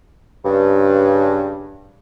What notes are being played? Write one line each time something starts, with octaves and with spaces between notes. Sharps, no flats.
G2 C#3